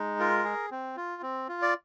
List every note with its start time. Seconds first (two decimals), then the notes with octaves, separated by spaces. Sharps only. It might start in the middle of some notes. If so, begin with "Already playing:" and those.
Already playing: G#3 D#4
0.19 F4 A#4
0.44 G#4
0.71 C4
0.97 F4
1.22 C4
1.48 F4
1.62 D5